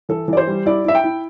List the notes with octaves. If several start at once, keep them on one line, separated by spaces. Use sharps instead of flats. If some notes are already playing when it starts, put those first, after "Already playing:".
E3 A4
E3 D5
C5
G3
E4 D5
E4 E5
G5
E4